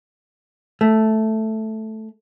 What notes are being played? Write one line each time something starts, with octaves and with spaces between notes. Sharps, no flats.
A3